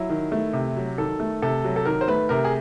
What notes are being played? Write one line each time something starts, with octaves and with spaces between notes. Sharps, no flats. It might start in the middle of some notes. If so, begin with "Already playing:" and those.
Already playing: F#3 E4
D#3
A3
C3
F#3
D#3 A4
A3
C3 A4
F#3
A4
D#3 A#4
C5
A3 B4
C3 A#4
G#4